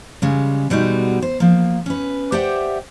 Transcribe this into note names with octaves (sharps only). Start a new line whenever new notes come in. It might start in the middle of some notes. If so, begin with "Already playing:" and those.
C#3 G3 G#3
B2 G3 G#3 D#4 F#4
C5
F3 A#3
C#4 B4
G4 C5 D5 E5 F#5 G5